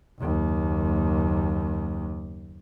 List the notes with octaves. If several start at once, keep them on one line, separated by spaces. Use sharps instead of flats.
F#1 D#2